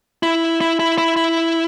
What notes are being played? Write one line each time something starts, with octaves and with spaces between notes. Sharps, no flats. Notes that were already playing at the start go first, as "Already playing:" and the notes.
E4
E4
E4
E4
E4